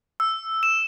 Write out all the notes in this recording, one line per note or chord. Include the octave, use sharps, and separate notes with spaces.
E6
E7